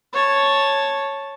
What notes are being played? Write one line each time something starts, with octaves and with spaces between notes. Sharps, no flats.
C#5 A5